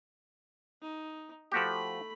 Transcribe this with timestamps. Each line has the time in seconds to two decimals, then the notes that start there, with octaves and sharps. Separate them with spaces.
0.82 D#4
1.52 F3 A3 F#4 G4 B5